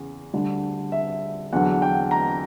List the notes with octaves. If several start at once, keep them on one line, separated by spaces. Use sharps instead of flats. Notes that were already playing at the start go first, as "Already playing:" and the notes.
Already playing: E2 C#3
D2 D3 G3
E5
E2 D3 F#3 F#5
G5
A#5